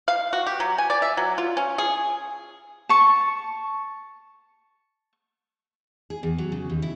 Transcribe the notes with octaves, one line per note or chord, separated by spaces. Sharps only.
F5
F#4
G4
F#3
G#5
D5
E5
F#3
F4
C#4
G#4
A5 C#6
G#4
E2
F#3
C#3
D#2
E4